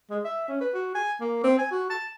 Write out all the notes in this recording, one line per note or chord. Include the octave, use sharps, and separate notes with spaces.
G#3
E5
C#4
B4
F#4
G#5
A#3
C4
G#5
F#4
A5